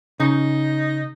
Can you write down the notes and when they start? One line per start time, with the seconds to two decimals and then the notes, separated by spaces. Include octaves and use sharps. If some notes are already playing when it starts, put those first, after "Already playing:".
0.20 C#3 D#4